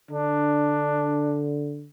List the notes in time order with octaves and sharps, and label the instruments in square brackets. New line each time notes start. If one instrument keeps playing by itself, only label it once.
[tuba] D3 [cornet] D4